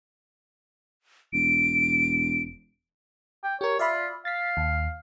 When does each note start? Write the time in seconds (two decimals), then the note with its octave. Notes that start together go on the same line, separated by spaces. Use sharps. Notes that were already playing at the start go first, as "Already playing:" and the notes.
1.33 E1 D7
3.44 G5
3.61 G4 A#4 C#5
3.79 F4 D5 E5 B5
4.25 F5 A6 B6
4.57 D#2